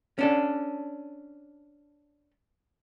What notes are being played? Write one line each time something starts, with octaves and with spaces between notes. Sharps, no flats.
C#4 D4 A4